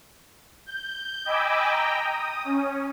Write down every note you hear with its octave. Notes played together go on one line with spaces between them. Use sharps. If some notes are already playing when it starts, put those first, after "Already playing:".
G6
D#5 G5 G#5 B5 D6 E6
G5 A#5
D#6
C#4